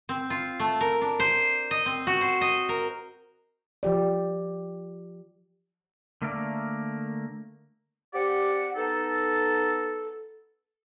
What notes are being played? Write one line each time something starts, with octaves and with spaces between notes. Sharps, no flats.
C4
F4
A3
A#4
D4
C5
D#5
C4
F#4
C5
D#5
A#4
F3 G4 D5
D3 A3 A#3 A#4 D5
C4 G4 D5 F#5
B3 D#4 A4